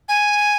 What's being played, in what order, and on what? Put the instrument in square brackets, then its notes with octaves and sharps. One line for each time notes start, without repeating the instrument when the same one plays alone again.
[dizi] G#5